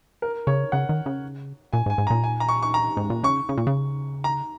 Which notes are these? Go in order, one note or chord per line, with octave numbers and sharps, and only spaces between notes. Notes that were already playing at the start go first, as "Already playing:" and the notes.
A#4
C#3 C#5
C#3 F#5
D#3
C#3
A#2 G#5
G#2
G#5
G#2
A#5
A#2
G#5
A#5
C#6
C#6
A#5
G#2
A#2
C#3 C#6
C#3
A#2
C#3
A#5